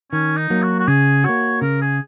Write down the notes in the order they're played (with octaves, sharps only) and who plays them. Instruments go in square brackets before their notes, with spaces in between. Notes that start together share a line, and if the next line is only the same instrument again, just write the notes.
[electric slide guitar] D#3 [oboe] C#4
[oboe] D#4
[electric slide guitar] F#3 A#3
[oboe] F#4
F#4
[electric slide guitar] C#3 [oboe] G#4
[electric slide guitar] A#3 F#4 [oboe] C#5
[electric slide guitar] C#3 [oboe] A#4
[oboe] G#4